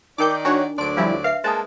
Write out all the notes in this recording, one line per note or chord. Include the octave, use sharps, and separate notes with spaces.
D#3 D#4 A#4 D5 G5 D6 G6
D4 F#4 C#5 F#5 G#5 A#5
D2 F#3 D4 D5 C6 D7
F3 G3 E4 F5 G#5
B4 E5 F5 C7
G#3 A#3 C5 G#5 A5 D#6